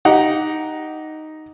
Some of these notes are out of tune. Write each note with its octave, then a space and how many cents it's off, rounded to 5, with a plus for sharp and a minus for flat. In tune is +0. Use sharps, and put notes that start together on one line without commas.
D#4 +0 G4 -15 F#5 +5